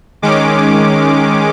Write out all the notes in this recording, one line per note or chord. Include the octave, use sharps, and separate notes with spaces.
D#3 G#3 C#4 D6